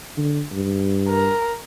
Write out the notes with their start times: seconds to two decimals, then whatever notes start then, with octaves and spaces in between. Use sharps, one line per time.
0.17 D3
0.52 G2
1.09 A#4